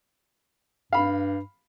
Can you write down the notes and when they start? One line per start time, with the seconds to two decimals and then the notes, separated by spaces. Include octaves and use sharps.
0.93 G2 F5 B5